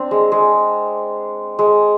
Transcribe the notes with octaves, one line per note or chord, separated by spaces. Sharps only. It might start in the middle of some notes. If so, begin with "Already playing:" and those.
Already playing: C4 D4
G#3
G#3
G#3